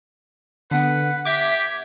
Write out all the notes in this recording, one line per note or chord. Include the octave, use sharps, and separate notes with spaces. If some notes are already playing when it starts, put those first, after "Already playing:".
D3 B3 B4 F#5
G4 E5 D6 G#6 B6